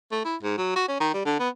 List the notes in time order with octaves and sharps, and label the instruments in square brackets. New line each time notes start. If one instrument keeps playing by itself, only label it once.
[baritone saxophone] A3
E4
G#2
F#3
F#4
C#4
D#3
G3
D3
B3